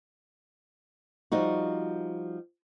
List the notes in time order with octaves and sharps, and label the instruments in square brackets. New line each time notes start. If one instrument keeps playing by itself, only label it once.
[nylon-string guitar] F3 G3 D#4 F#4